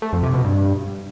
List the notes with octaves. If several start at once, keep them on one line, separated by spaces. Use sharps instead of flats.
A3
F2
C3
B2
G2